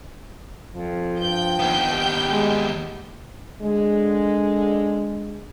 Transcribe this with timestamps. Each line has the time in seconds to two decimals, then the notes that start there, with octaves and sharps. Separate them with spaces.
0.75 F2 F3
1.19 G2 G5 G6
1.59 D#2 B3
1.92 G4
2.31 G#3
3.60 D3 G#3